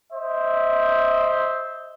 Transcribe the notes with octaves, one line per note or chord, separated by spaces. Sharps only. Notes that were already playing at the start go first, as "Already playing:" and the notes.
C5 D#5 E5